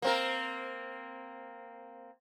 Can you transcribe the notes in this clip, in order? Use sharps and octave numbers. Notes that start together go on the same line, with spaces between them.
A#3 C4 A#4